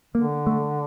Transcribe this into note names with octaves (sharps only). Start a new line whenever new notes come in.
D3 A#3
A3